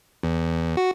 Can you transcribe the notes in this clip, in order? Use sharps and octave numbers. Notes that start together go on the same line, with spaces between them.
E2
F#4